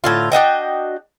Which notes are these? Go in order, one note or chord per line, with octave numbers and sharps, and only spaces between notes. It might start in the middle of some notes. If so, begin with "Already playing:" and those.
A2 D3 F4
D4 F#4 D#5 G5